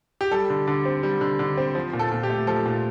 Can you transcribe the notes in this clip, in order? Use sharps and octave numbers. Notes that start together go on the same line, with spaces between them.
G4
G3 A4
D3
D3
C4
G3
D3
D3
C4
F3
A#2
A4
A#2
G4
A3
F3 A4
A#2